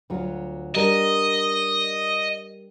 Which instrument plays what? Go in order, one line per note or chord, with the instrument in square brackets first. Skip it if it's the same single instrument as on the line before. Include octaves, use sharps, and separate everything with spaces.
[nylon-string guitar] D2 F#3 F4
[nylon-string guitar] G3 D4 A#4 [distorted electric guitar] D#5